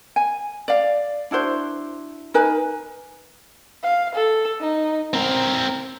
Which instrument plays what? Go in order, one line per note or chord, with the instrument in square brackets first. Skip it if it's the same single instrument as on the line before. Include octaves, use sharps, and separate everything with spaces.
[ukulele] G#5
D5 F5
D4 E4 F#4 C5
D#4 A#4 B4 G#5
[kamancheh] F5
A4
D#4
[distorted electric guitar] C4 A#4